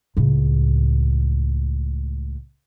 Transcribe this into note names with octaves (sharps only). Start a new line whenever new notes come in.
C#2 A2